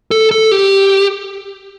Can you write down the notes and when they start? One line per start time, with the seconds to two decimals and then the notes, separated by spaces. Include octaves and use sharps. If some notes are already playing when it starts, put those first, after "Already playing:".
0.11 A4
0.31 A4
0.52 G4